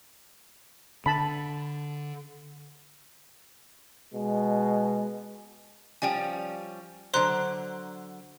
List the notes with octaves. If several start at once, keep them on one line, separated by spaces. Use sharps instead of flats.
D3 A5 B5
B2 G#3
F3 G3 C#4 G5 G#5
D3 F#3 C5 A#5 C6 F#6